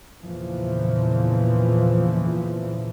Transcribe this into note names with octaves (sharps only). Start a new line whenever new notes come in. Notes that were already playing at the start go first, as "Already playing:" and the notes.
E2 A#2 C#3 E3 F3